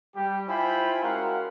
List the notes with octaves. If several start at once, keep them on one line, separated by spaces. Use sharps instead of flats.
G3 G4
E4 F4 C5 G5 G#5 B5
G#3 C#4 F#4 A#4 F5 F#5